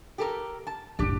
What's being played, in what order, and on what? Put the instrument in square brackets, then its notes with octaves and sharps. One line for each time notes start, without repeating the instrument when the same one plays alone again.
[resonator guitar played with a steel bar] G4 A4 A#4
A5
[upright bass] F#1 A2 [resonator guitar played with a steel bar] D4 G4